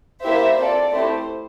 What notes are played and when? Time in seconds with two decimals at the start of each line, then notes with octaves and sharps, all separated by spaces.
0.23 A#3 E4 G4 C5 E5
0.58 C4 F4 A4 D5
0.92 A3 C4 E4 G4 C5